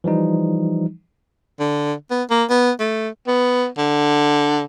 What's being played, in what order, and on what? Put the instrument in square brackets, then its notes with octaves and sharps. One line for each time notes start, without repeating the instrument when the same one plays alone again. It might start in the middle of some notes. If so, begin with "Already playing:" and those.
[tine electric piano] E3 F3 G3 D#4
[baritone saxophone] D3
B3
A#3
B3
A3
B3
D3